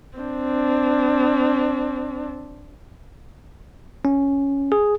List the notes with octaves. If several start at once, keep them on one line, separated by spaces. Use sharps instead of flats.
C4 D4
C#4
G#4